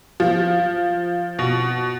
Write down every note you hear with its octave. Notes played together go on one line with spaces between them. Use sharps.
F3
B2